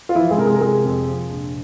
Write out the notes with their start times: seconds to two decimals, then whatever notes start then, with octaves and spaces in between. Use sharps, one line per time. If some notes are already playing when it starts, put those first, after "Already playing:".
0.09 F4
0.15 E3 F3 E4
0.31 G#3 G#4
0.37 C3 A#4
0.46 G#3 G#4
0.55 A#4
0.61 C3 G#3 G#4
0.85 F2
1.07 F3
1.30 A#1